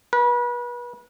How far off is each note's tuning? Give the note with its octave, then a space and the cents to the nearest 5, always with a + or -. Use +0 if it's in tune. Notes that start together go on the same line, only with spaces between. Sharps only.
B4 -30